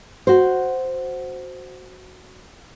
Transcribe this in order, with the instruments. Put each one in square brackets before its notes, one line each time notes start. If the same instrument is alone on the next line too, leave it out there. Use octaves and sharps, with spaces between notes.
[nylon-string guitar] F#4 C5